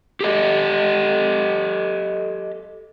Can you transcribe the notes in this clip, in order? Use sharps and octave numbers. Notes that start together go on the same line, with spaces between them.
G4 A4 D#5